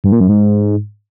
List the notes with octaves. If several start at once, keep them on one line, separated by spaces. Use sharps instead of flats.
G2
A#2
F#2
G#2